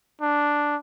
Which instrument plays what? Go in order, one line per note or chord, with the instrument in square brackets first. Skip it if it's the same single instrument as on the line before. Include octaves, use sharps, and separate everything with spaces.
[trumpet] D4